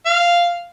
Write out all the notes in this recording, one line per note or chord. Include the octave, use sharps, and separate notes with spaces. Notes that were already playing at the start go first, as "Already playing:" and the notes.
F5